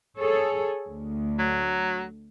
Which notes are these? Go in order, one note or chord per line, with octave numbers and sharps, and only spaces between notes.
G#4 A4 C#5
D2
F#3